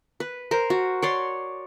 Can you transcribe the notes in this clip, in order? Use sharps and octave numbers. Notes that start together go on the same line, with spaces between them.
B4
A#4 C5
F#4
C#5 D5 C6